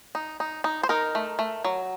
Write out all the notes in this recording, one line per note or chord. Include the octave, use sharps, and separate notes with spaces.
D#4
D#4
D#4
C5
D#4 A#4
A3
A3
F#3